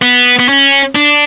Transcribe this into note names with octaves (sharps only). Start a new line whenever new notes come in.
B3
B3
C#4
D4